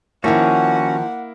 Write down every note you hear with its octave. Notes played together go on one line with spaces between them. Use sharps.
D#3 F3 A#3 C#4 E4 F#4 F#5